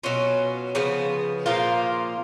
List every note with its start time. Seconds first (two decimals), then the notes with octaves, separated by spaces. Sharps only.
0.03 B2 F#3 C#4 F4
0.75 C#3 F3 B3
1.46 A#2 F3 A#3 F4